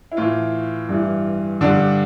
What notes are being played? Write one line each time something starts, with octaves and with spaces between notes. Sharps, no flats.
E4
A2 E3 F4
G2 E3
G2 D3 D4